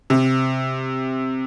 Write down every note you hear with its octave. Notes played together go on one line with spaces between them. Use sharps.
C3